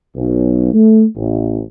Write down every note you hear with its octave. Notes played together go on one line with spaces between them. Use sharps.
B1
A3
A1